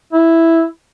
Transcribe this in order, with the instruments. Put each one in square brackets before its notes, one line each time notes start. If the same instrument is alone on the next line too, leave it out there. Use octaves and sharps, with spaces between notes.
[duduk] E4